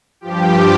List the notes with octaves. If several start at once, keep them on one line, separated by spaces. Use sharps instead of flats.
G2 F3 G4